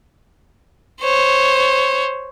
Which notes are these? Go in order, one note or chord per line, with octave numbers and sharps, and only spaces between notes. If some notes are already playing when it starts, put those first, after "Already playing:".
C5 C#5